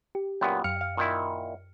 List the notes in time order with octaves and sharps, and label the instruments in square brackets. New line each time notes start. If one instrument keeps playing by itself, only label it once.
[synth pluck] G4
[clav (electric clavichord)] F#2 A#2 B3 [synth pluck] G5
[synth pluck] F#2 F6 C#7 [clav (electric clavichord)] F5
[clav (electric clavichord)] F5
A#2 D#3 E4